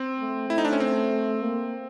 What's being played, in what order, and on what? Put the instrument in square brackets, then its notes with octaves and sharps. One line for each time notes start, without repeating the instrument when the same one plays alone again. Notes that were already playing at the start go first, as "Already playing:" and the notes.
Already playing: [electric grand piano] C4
[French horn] A3
[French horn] A3 [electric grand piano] E4
[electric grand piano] D#4
D4
C#4
C4
[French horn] A#3